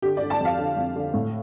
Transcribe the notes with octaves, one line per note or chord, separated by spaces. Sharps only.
D3 G4
D5
D3
A5
F2 F5
D3
F2
D3
A2